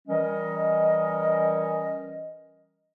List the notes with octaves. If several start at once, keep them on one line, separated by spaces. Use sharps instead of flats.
E3 G3 C#4 A#4 D#5